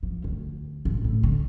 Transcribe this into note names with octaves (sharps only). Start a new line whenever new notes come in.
F3
D2
A1
A2
D3